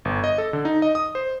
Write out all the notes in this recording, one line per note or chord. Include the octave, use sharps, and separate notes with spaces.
G1
D#5
A4
D3
D#4
D#5
D#6
C5